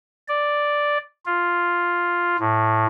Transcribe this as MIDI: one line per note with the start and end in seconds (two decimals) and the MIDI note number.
0.28 0.98 74
1.26 2.37 65
2.39 2.86 45